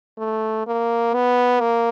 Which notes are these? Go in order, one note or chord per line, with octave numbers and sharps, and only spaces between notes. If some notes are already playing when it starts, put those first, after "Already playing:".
A3
A#3
B3
A#3